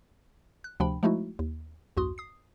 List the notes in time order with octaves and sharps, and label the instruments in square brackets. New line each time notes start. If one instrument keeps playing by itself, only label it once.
[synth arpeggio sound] F#6
D2 C3 F3 D4 G5 B5
F3 G#3 A3 D#4 E4 F#4
D#2
B1 E2 G2 F#4 C6 D#6
D#6 C7